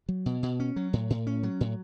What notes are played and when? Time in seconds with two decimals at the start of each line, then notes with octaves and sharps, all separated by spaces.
0.09 F#3
0.26 B2
0.43 B2
0.60 C#4
0.76 F#3
0.93 A2
1.10 A2
1.27 C#4
1.43 F#3
1.61 A2